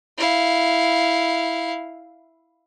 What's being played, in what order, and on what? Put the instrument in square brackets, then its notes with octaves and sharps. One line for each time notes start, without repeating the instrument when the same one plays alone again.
[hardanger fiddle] E4 F5